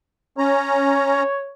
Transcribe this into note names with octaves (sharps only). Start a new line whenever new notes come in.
C#4 C#5 A#5